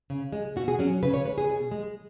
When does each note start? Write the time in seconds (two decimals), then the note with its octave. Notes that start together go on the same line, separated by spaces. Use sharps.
0.10 C#3
0.32 G#3
0.56 B2 F#4
0.68 G#4
0.79 F#3 C#4
1.03 C#3 B4
1.14 C#5
1.25 G#3 B4
1.38 G#4
1.49 B2
1.71 G#3